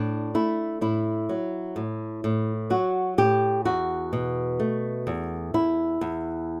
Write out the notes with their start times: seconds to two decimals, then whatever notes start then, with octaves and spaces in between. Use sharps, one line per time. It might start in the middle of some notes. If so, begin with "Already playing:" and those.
Already playing: A2 D4
0.35 A3 E4
0.81 A2 E4
1.29 F#3
1.76 A2
2.24 A2
2.70 F#3 F#4
3.18 A2 G4
3.65 E2 F#4
4.13 B2
4.60 A3
5.07 E2
5.54 E2 E4
6.01 E2